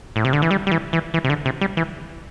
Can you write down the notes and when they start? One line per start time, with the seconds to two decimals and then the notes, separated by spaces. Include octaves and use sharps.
0.16 A2
0.25 C3
0.33 D3
0.42 E3
0.51 G3
0.67 G3
0.71 E3
0.93 E3
1.14 E3
1.24 C3
1.30 D3
1.46 C3
1.61 G3
1.77 E3